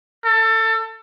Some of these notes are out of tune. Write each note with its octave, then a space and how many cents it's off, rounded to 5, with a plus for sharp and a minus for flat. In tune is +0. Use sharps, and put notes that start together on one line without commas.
A4 +25